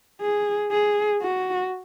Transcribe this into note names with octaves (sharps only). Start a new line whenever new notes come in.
G#4
G#4
F#4